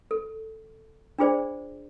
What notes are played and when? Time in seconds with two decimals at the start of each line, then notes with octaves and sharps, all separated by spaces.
0.11 A4
1.19 D4 F4 G#4 C5 D5